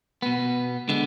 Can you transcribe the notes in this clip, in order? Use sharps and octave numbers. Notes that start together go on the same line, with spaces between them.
B2 B3
D3 G#3 B3